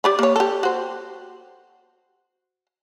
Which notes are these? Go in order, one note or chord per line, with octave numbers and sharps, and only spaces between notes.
G4 D5 B5
A#3 C#5
G4 A4
F#4 C5